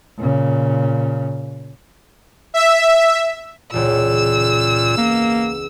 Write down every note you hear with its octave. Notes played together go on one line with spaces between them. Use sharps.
A#2 C#3
E5
E1 C#2 A#2 E6
A#3 B3